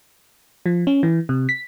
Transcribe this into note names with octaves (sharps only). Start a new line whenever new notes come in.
F3
C#4
E3
C3
B6